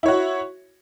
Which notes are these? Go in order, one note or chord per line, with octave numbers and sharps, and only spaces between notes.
E4 F#4 C#5